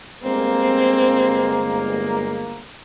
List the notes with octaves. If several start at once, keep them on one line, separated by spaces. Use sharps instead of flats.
G1 G#3 A#3 C4